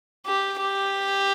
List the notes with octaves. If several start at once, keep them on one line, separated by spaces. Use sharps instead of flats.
G4
G4